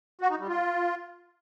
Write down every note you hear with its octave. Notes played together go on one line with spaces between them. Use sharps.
F#4
D#4
G3
F4